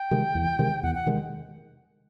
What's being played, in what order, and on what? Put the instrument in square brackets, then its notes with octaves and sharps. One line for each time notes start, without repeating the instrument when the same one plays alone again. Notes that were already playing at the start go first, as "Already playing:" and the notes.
Already playing: [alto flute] G5
[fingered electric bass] C3 D#3 G#3
E2
C3 D#3 G#3
[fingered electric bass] E2 [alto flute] F#5
[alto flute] F#5
[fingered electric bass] C3 D#3 G#3